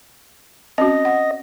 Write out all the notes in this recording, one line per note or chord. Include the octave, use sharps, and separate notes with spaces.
C4 C#4 F#4 D#5
F#5